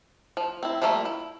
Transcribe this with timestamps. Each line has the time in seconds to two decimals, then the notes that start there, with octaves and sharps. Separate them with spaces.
0.37 F3
0.63 C4 E4
0.82 F3 G3 A3 A#3 E5
1.05 E4